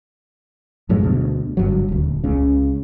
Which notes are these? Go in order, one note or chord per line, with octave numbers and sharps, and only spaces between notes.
F#2 A2 F#3 G#3
D2 B2
G1 G2 F#3
D#1 D2
C#2 C#3